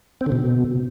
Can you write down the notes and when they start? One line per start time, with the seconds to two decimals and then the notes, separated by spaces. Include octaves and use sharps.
0.21 C4
0.26 D3
0.32 B2